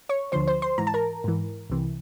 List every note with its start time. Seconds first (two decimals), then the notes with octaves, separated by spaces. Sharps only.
0.09 C#5 C#6
0.32 D2 D3 F3 C5 C6
0.48 C5 C6
0.62 C5 C6
0.78 G#2 E3 A#5
0.87 A5
0.94 A#4 A#5
1.24 G#2 E3
1.70 C2 C3 E3